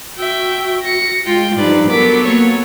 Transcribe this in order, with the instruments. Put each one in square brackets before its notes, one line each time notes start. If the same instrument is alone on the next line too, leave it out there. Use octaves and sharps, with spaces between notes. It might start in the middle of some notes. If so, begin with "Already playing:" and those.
[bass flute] F#4 [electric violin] E5 G5
[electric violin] A#6 C#7
[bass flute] G#3 [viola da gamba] F4 [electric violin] G5
[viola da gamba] G2 F3 [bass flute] D#4 [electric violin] B4 D5
[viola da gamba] F#3 B3 A4 [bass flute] A#4 [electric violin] D6 B6
[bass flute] A#3 [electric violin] C#5